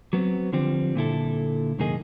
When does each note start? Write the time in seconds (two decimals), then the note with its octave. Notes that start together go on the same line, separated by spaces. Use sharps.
0.13 F#3 B3 C4
0.53 D3 F3 G3 C4
0.95 A#2 D3 E4 A4
1.79 C2 F#2 D#3 A#3 G#4 D#5